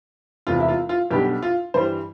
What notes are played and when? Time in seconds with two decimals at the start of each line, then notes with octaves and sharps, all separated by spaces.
0.47 E1 E2 C3 E3 F4
0.60 E4
0.68 F4
0.89 F4
1.11 B1 B2 G3 D4 G4
1.42 F4
1.74 G2 E3 G3 C5